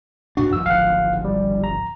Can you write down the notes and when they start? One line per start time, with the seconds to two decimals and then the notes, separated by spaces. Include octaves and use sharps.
0.37 A2 D4 F#4
0.53 D#2 F3 E6
0.66 D1 G#1 F3 F5 F#5
1.25 G3
1.64 A#5